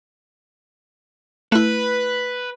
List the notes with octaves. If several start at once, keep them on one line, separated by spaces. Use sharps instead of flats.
A3 E4 B4